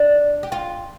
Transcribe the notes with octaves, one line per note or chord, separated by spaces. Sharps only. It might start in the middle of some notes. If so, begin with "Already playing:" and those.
Already playing: D4
G4
F4